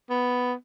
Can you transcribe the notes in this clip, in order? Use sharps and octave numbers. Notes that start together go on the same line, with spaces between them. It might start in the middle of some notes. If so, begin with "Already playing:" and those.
B3